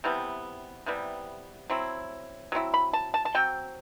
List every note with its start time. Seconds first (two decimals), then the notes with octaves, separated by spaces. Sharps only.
0.04 C3 E3 G3 B3
0.86 C3 E3 G3 B3
1.70 F#3 C4 E4
2.52 F#3 C4 E4
2.74 B5
2.93 A5
3.14 A5
3.25 A5
3.35 F#3 C4 G5